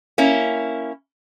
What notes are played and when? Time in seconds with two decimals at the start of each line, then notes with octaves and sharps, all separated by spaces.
0.18 A#3 C#4 E4